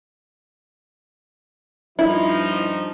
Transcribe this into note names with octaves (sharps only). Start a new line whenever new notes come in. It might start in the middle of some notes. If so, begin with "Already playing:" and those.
G2 F3 D#4 E4